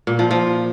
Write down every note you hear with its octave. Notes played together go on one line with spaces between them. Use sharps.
A#2
F3
F3